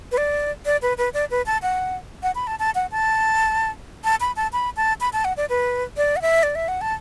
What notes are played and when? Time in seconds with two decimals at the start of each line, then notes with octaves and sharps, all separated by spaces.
0.12 B4
0.17 D5
0.65 D5
0.82 B4
0.98 B4
1.14 D5
1.31 B4
1.46 A5
1.62 F#5
2.23 F#5
2.35 B5
2.47 A5
2.59 A5
2.75 F#5
2.91 A5
4.04 A5
4.21 B5
4.36 A5
4.53 B5
4.76 A5
5.01 B5
5.13 A5
5.25 F#5
5.37 D5
5.49 B4
5.97 D5
6.16 F#5
6.22 E5
6.43 D5
6.55 E5
6.68 F#5
6.81 A5